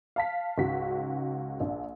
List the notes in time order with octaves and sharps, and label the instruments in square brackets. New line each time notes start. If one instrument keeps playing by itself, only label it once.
[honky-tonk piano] F5 A5 B6
C#2 G#2 C#3 F#4 B6
A#1 D4